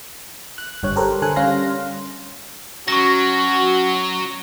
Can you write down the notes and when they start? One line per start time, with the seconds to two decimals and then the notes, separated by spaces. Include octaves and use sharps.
0.58 F#6
0.83 G1 G2 C#5 F#6
0.96 G4 A4 A#4 C5
1.22 D3 A4 G#5 F#6
1.36 G3 C#4 F5 C6 A#6
2.88 F#3 C#4 F#4 C#6 A#6